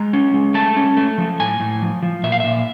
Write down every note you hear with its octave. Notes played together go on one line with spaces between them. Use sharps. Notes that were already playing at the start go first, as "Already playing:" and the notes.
Already playing: G#3 A#5
C#4
G#3
A3 A5
C#4
A3
F3
A2 G#5
A2
F3
F3
A#2 E5
F5
A#2 E5